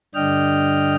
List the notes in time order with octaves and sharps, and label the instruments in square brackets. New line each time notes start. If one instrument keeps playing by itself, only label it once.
[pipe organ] G2 D3 D4 D#5 G5 F6